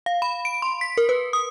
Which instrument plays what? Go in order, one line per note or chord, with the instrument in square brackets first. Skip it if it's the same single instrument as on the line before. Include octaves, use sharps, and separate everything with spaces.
[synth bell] F5
B5
D7
C6
B6
A#4
B4
D#6